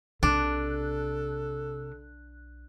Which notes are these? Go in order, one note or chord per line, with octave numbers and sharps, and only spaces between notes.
B1 C3 D4 A4 F#6